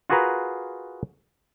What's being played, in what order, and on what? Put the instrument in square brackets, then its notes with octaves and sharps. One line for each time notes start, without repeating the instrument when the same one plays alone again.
[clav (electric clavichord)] F4 F#4 G#4 A#4 B4 A#5